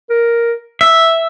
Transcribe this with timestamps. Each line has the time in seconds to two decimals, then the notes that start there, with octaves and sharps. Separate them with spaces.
0.10 A#4
0.81 E5